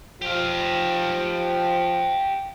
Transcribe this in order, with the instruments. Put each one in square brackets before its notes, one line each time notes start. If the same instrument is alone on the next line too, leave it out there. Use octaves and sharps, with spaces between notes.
[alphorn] F3 [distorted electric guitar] G4 F5